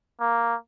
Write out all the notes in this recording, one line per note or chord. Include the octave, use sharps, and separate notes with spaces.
A#3